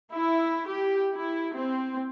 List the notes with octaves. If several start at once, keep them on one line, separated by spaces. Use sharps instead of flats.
E4
G4
E4
C4